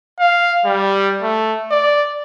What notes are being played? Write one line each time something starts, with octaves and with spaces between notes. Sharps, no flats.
F5
G3
A3
D5